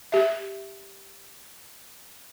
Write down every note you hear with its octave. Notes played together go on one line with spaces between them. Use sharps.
G4 E5